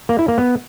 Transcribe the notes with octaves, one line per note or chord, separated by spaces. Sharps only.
A#3
E4
A#3
B3